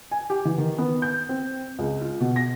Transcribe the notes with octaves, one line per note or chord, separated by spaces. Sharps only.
G#5
G4
E3
D#3
B3
G6
C4
C#2
F4
B2
A#6